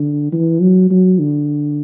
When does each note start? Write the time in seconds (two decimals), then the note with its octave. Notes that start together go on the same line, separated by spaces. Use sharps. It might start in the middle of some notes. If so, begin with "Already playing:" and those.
Already playing: D3
0.32 E3
0.61 F#3
0.90 F#3
1.19 D3